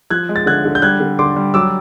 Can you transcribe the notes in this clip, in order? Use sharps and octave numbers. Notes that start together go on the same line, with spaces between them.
F3 F#6 G#6
G#3
A6
D3 F#6 G#6
D3
G6
G3 F#6 G#6
D3
D3 C6 D6
G3
F#3 D6 E6